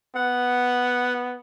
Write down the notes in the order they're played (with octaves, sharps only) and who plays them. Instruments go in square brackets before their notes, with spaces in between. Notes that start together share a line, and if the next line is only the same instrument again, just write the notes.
[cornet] B3 [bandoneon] F#5